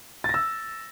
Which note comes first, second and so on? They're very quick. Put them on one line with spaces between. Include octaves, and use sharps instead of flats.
A6 A#6 E6